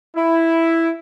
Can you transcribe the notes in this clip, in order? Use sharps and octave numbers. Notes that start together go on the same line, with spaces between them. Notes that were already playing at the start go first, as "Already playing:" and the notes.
E4